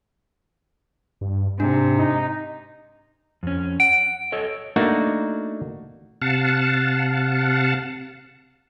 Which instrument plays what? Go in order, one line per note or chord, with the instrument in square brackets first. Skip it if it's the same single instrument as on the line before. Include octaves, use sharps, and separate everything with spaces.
[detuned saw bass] G2
[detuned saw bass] G#2 [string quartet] C3 [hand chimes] D4
[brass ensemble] D#4
[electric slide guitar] F2 C#4
[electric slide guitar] F#5 [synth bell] D7
[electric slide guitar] A4 C#5 D#5
[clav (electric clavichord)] A3 A#3 D4 D#4 F#4
[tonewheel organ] C3 F5 F#5 A5